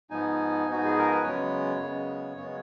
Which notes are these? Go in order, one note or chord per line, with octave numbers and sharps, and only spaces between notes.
G#2 F3 B3 D#4 G#5
G#2 F3 B3 D#4 F#4
G#4
A#4
B4
F#2 C#3 G#3 B3 C#5
F#2 C#3 G#3 B3
F#2 C#3 G#3 B3 C#5